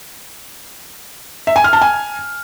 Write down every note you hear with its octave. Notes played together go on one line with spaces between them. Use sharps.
E5
G#5
F6
A5
G#5